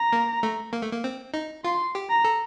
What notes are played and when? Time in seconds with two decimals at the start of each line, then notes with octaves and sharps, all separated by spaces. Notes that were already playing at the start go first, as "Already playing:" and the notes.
Already playing: A#5
0.13 A#3
0.43 A3
0.73 A#3
0.82 A3
0.92 A#3
1.04 C4
1.34 D#4
1.65 F4 C6
1.95 G4
2.10 A#5
2.24 A4